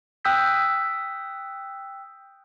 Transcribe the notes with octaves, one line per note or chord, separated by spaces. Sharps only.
G5 D#6 E6 F#6 G6 B6